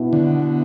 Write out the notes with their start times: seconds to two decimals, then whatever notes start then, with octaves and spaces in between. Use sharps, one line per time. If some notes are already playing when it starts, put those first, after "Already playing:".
Already playing: B2 B3 E4
0.13 D3